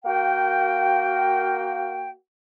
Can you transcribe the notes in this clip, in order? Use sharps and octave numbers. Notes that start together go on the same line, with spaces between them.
A#3 F#4 A#4 F5 G5